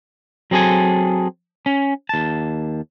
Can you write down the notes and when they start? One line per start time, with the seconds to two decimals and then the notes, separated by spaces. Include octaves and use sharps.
0.51 F#3 C4 G#4 A4 G#5
1.66 C#4
2.09 D#2 A5